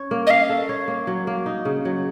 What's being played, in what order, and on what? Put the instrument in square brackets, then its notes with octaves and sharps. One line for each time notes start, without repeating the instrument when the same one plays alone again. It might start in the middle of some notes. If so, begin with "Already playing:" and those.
Already playing: [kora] C#4 C#5
A#3
[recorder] D#5
[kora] C#4 [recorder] F5
[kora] A4
C#5
A#3
F#3
A#3
D#4
C#3
F#3